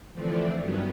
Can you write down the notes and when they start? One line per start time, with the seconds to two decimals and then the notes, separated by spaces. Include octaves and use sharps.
0.14 D3 E3 F3 A3 C4 D4
0.60 G2 D#3 F#3 B3 C#4